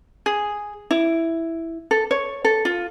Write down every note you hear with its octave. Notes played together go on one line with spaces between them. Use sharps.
G#4
E4
A4
C#5
A4
F4